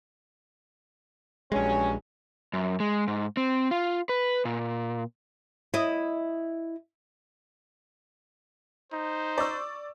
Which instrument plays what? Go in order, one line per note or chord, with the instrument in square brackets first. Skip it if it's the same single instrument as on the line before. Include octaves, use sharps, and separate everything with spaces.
[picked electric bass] A#1 G#3 [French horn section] G2 F#3 C#4
[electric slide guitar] F#2
G#3
G#2
C4
F4
B4
A#2
[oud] E4 D#5
[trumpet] D#4 [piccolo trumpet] C5
[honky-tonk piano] D5 C#6 E6